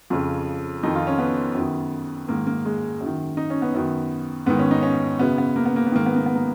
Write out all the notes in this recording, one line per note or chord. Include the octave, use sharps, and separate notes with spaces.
F2 C#3
F2 D#3 D#4
F4
C#4
B3
F#2 D#3
G#2 D#3 A#3
A#3
G#3
F#2
D#3
D#4
C#4
B3
F#2 D#3
G#2 D#3 B3
C#4
D#4
C#4
F#2 C#3 B3
B3
A#3
B3
A#3
B3
G#2 D#3 A#3
B3
A#3
B3
A#3